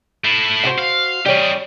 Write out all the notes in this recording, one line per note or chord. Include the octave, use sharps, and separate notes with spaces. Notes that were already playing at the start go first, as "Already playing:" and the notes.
A3 E4
F#4 G4 C5
F5
G3 C#4 G4 D#5